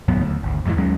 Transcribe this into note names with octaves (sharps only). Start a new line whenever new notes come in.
D#2 A2 F#3 B3
D2
G#1 D2
F2 G#2 C#3 E3
D#2 F#3 G#3 C#4